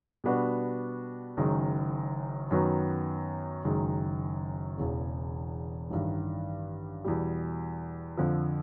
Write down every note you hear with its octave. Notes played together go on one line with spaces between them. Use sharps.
B2 G3 B3 D4 F#4
F#1 F#2 D#3 G#3
F#2 D#3 F#3 B3
F#1 F#2 D#3 G#3
E1 E2 C#3
A1 G2 D#3
E2 B2 G3
F2 D3 F3